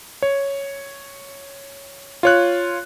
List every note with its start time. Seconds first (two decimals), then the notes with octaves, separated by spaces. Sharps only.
0.22 C#5
2.23 F4 C#5 F#6